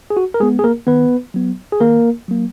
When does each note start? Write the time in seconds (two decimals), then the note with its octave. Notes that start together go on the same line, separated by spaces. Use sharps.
0.10 G#4
0.17 F#4
0.34 A#4
0.40 G#3 B3 G#4
0.59 G#4
0.64 A#3 A#4
0.87 D#3 B3 B4
1.34 F#3 B3
1.72 G#4
1.80 D#3 A#3 A#4
2.28 F#3 A#3